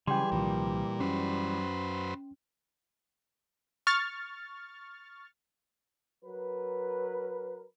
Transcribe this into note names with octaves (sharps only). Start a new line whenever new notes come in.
C#3 E3 F#3 G3 G#4 G5 C6
C2 A#2 D#3 F3
F#2 C#4 B4 C5
C#6 F6 A6
F#3 A#4 B4